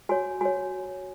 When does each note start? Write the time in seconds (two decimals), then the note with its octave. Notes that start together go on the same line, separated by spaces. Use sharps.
0.09 F#4 C#5 G#5
0.41 F#4 C#5 G#5